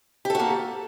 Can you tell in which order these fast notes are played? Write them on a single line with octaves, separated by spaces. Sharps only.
G4 A4 F#4 A#3